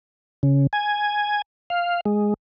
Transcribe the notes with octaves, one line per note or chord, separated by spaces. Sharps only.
C#3
G#5
F5
G#3